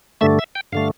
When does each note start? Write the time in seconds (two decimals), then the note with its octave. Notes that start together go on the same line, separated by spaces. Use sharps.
0.21 G2 D3 A3 E5
0.39 E5
0.55 G5
0.72 G2 D3 A3 F5